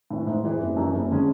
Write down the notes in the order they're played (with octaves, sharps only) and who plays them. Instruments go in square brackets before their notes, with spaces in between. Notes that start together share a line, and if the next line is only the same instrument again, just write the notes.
[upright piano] A2 E3
G#2
E3 G#3
F#1
F#2 E3
F#1
D3 G#3 C#4